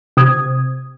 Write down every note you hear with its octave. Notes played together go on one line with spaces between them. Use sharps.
C3 D#6 G#6